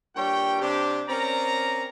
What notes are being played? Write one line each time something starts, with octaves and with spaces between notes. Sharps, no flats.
G2 A#2 G3 C#5 G5
C3 D4 G4
C4 C#4 A#4 D5 A#5